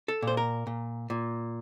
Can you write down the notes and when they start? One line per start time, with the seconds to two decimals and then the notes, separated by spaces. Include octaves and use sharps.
0.08 A4
0.22 A#2
0.27 C5
0.37 A#4
0.67 A#2
1.10 A#2